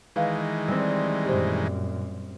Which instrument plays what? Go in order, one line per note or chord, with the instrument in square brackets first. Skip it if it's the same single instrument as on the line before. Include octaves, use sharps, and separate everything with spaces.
[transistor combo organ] D#3 E3 G#3 [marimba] B4 D#5 F5
[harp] G3 C4 [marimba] E6
[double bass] F#2 A#2 [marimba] G4 C5